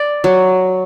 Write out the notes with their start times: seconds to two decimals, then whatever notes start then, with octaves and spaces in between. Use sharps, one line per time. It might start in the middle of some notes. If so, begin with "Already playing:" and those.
Already playing: D5
0.24 F#3